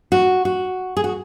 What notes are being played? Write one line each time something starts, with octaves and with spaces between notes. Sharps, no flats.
F#4
F#4
G#4
F#4